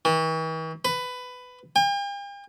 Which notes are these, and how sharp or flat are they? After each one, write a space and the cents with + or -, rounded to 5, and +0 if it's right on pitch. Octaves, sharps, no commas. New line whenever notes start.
E3 -45
B4 +15
G5 +45